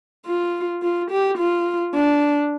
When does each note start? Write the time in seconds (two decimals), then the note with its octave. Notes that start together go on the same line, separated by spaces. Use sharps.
0.26 F4
0.82 F4
1.11 G4
1.38 F4
1.94 D4